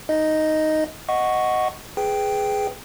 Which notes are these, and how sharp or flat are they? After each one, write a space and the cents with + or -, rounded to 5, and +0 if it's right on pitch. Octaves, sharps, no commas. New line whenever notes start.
D#4 +0 D#5 +0
D#5 +0 F#5 +0 C#6 +0
G#4 +0 B4 +5 G5 +0